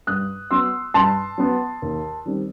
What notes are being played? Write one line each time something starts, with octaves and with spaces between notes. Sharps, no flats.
G2 D#6 F#6
F#3 B3 C6 E6
G2 A5 C6
F#3 B3
D#2
D#3 G3 C4